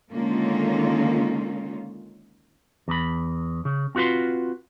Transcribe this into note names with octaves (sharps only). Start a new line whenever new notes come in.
D3 D#3 G#3 A#3 C#4 F4
E2 B5
C#3
C4 F4 F#4 B4 C6